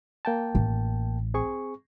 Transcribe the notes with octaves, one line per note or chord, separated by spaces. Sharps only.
A#3 G5 A5
A1
C4 G#4 C#6